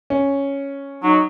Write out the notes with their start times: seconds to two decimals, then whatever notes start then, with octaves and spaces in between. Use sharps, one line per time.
0.10 C#4
1.03 F#3 D#4